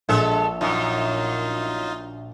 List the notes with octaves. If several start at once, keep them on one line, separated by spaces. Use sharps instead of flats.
A#1 G#3 A4 E5
F#2 D#4 F4